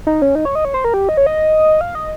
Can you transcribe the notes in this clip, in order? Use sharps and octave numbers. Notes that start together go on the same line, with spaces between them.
D#4
C#4
D#4
C#5
D#5
C#5
C5
A#4
G4
D#5
C#5
D#5
F5
D#5